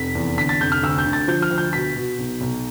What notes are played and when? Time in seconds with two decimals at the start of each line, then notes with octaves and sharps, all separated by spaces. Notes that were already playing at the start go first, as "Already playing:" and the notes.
Already playing: F1 B6
0.15 E2
0.38 D3 B6
0.49 A6
0.60 F1 G6
0.72 F6
0.83 D2 E6
0.98 G6
1.06 D3
1.13 A6
1.28 F3 G6
1.42 F6
1.50 D2
1.58 G6
1.73 B2 B6
1.96 B2
2.19 B1
2.41 B1